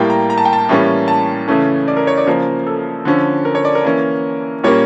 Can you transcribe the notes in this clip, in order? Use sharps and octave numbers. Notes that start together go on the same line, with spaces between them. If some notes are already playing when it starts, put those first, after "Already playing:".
Already playing: A2 G3 A#3 G5
A#5
A#5
A5
G5
A5
A2 E3 G3 A#3 C#4
A5
C#3 E3 A3 C#4
D5
A#4
C#5
D5
C#3 F3 A#3 A#4
A4
D3 F3 C#4
A#4
C#5
D5
A#4
E3 A#3 C#4
A#2 G3 A#3 C#4 C#5